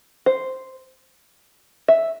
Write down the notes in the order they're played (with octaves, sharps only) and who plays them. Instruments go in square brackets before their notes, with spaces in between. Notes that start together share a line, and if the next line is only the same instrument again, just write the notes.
[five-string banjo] C5
E5